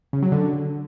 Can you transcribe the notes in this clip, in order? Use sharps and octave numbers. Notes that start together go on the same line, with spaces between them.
C#3
F#3
D3